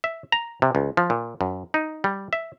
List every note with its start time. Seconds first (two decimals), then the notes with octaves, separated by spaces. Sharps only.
0.04 E5
0.32 A#5
0.62 C3
0.75 C#2
0.97 F3
1.10 A#2
1.41 F#2
1.74 D#4
2.04 G3
2.33 E5